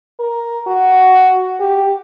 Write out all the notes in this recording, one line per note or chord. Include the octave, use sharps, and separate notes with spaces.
A#4
F#4
G4